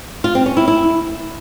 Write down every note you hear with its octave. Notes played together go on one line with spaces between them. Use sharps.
F4
C4
C#4
E4
E4